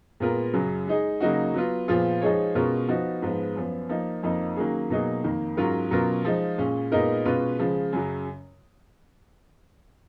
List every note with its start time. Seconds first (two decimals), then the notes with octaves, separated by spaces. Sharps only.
0.20 A#2 G#3 B3 F4 A#4
0.53 F#2 C#3 F#3
0.87 G#3 D#4 G#4
1.20 C#3 F#3 A#3 D#4 F#4
1.54 F#3 B3 F4
1.87 A#2 F3 B3 F4 G#4
2.21 F3 G#3 D#4 G#4 C#5
2.55 B2 G#3 C#4 F4 A#4
2.89 F3 B3 D#4 F#4
3.22 G#2 F3 G#3 B3
3.56 F#2 F3 B3
3.89 F3 A#3 D#4
4.23 F2 F3 A#3 D#4
4.56 D#3 F#3 A#3 C#4 G#4
4.90 B2 F#3 A#3 D#4 G#4
5.24 F2 D#3 A#3
5.57 G#2 F#3 C#4 F4 A#4
5.91 B2 F#3 C#4 F4 A#4
6.25 F3 G#3 D#4
6.58 A#2 G#3 C#4
6.92 A#2 G#3 B3 D#4 A#4
7.25 B2 G#3 C#4 F4 B4
7.59 C#3 F3 G#3
7.93 F#2 C#3 F#3